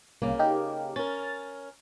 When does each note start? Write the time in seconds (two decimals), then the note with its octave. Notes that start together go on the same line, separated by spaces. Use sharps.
0.22 C2 C#3 A#3
0.39 D#4 G4 A#4
0.96 C#4 A#4 A6